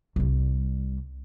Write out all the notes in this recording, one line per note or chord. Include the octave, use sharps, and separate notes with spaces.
C2 G3